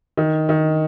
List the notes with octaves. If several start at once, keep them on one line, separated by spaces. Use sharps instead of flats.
D#3
D#3